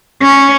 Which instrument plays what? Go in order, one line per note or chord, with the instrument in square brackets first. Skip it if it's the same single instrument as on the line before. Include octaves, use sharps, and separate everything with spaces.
[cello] C#4